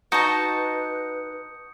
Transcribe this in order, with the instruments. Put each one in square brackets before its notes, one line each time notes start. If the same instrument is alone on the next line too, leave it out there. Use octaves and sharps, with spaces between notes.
[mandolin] D#4 [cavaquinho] F#4 A5 [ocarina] B4 [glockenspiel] D#6 G6 C#7